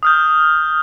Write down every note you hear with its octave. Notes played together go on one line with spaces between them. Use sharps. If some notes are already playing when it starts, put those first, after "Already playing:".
D#6 F6 G6